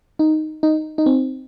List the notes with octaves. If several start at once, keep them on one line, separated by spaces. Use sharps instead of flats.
D#4
D#4
D#4
C4